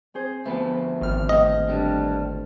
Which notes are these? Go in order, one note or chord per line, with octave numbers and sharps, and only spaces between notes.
C4 G#4 C5
D2 F3 A3 B3 B5
G#1 F6
A2 D#5
G3 D4